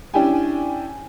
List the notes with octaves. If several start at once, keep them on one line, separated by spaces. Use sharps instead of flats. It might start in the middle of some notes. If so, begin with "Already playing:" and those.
C#4 D4 E4 G4 G5 G#5